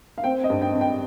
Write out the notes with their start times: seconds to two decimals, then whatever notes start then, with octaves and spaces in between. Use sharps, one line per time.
0.18 F5
0.24 C4 G5
0.44 D#5
0.50 G2
0.62 G5
0.74 G#1
0.81 G5